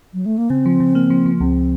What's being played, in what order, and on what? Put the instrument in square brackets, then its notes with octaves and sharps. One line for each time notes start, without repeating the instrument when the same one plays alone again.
[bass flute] F#3
A3
A#3
[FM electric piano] C#3 [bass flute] C4
[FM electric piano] F3
C#3
A#3
F3
F3
[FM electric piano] C#2 [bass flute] C4